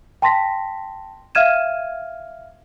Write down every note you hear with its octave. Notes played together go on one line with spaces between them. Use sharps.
G5 A5 C6 A#6 B6
E5 F5 F6 G#6 D#7 E7